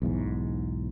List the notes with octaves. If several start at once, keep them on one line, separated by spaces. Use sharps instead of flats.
B1 E2 G#2